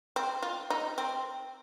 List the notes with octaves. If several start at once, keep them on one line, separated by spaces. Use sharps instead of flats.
C4
F4
D#4
C4